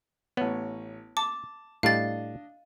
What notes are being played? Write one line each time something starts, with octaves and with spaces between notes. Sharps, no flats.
A1 B3 C#5
A5 D6
A2 G3 D4 D5 D#5 F5 A6